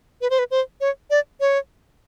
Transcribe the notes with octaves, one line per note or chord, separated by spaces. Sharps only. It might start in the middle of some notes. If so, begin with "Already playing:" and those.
B4
C5
B4
C5
C#5
D5
C#5